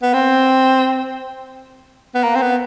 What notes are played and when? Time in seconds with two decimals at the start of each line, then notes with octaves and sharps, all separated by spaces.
0.02 B3
0.13 C4
2.15 B3
2.24 A#3
2.35 C4
2.42 B3